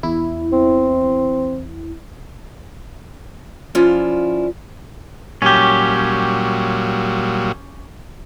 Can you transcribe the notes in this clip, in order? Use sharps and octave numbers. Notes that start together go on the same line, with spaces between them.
E2 E4
C4
F3 C#4 E4 F4 D5
A#2 F#3 G3 C#4 G4